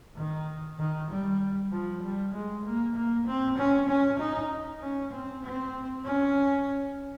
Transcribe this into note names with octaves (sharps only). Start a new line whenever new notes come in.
D#3
D#3
G3
F3
G3
G#3
A#3
A#3
C4
C#4
C#4
D#4
C#4
C4
C4
C#4